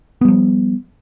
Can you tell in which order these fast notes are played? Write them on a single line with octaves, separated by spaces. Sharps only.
B3 G3 F3